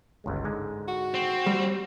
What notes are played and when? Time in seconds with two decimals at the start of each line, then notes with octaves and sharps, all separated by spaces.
0.24 G1 C#2 G#3
0.44 G#2 D3 G#3
0.88 F#4
1.14 C4
1.46 G3